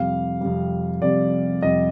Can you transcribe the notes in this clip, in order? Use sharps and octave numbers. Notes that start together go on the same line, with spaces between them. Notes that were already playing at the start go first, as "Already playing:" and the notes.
Already playing: F2 C3 G3 F5
F2 C3 G3
F2 C3 G3 D5
F2 C3 G3 D#5